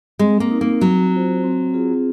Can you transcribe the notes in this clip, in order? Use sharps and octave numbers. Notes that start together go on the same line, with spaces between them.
G#3 C4
A#3
D#4 A#4
A#3
F#3 C4
F4 C5
C4
F4 G#4